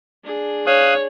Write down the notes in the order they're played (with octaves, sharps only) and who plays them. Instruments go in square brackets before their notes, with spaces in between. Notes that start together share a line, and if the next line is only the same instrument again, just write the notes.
[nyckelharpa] D4 G#4
[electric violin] C#5 [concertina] F5 D#6 F#6